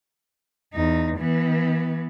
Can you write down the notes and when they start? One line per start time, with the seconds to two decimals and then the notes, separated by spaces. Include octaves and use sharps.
0.74 E2 D#4
1.18 E3 B3